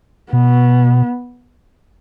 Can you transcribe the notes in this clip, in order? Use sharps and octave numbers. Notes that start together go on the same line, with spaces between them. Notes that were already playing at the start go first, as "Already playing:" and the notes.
B2 B3